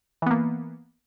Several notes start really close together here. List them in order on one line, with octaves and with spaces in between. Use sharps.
E3 B3 A#3